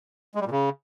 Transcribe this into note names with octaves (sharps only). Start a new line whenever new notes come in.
G#3
G3
A#2
C#3